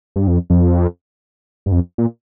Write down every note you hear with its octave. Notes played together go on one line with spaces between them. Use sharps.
G2
F2
F2
G2
F2
A#2